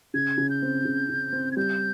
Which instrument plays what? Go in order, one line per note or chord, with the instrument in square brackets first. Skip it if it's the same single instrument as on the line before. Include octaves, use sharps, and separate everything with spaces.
[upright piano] C#3 [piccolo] G#6
[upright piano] C#3
[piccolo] G6
[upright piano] C4
C#3
C#3
C4
[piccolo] G#6
[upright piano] G3 [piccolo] G6